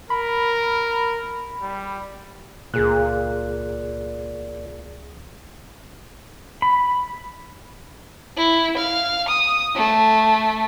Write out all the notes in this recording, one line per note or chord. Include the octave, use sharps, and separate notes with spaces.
A#4 B5
G3
C#2 A#2 G#4 F#6
B5
E4
F5
D#6
A3